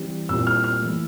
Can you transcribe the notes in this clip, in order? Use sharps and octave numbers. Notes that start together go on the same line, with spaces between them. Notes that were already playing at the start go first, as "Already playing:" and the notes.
Already playing: E3 G3 C4
A#2 G3 C4 E4 E6
F6
F6
E3 A3 E4